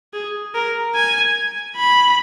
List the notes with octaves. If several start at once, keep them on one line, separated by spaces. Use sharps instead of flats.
G#4
A#4
G#5
B5